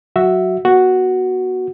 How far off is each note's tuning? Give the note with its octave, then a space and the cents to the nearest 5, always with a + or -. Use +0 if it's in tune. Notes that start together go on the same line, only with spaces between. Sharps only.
F#3 +0 F#4 +0 E5 +0
B3 -30 F#4 +0